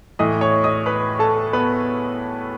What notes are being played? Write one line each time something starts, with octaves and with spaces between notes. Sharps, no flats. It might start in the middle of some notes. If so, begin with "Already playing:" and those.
A2 E3 D#5 D#6
C#5 C#6
D#5 D#6
B4 B5
A4 A5
B3 B4